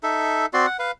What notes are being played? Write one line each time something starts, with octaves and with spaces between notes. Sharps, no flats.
D#4 A4 E5
C4 F#4 D5 C6
F#5
B4 F5